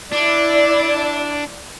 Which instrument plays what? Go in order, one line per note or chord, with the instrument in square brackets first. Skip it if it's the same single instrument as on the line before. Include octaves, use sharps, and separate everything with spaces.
[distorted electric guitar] D4 [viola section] E4 D5